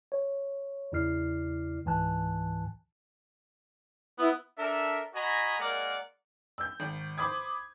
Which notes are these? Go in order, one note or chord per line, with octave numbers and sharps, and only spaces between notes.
C#5
E2 C#3 E4 D5 F6 C7
C#2 G#2 E3 G#5 A5 F#6
B3 E4
D4 A4 A#4 E5
F#4 D#5 G#5 A#5 B5
G#3 A#3 A#4 D5 F#5
E6 G6
G#1
C5 B5 D6 D#6 G#6